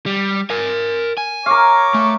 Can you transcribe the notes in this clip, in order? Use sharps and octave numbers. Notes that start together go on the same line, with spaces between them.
G3
A#4 G#5
G#5
A#4 C#5 F5 D6
A3